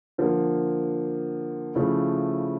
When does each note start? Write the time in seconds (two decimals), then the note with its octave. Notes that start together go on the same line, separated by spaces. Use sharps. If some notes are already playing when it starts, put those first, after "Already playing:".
0.18 D3 F3 A#3
1.75 C#3 F3 A3 E4